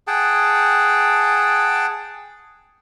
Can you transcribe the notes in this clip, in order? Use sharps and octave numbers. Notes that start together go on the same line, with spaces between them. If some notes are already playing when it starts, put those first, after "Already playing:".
G#4 F#5 G5 A5